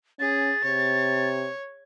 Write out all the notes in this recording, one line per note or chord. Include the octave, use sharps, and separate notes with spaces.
C#4 G#4 A6
C3 C#5